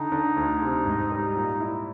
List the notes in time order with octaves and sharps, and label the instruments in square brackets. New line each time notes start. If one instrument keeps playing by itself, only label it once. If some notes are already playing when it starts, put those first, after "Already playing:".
Already playing: [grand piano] D3 [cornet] D#4
[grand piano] D3
D2
C3
G#2
G3
A#2
E4